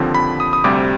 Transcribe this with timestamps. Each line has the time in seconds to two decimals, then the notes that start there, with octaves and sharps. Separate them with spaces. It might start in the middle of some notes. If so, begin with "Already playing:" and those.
Already playing: D#2 D3 F3 C4
0.14 B5
0.40 D#6
0.53 D#6
0.64 D2 C3 G3 C4 D6